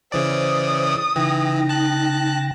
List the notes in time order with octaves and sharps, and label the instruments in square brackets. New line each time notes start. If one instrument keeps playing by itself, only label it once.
[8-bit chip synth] C#3 E3 D5 [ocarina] C5 [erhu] D#6
[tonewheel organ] C#3 G5 A#6 [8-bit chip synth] E3 [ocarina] D#4
[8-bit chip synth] A5 F#6